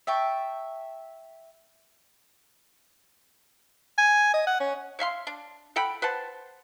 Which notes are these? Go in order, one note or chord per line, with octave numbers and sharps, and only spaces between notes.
E5 G5 A5 C#6
G#5
D#5
F#5
C#4
C#5 E5 F5 C6
D4
A4 F#5 G5 B5
B4 C5 F#5 A5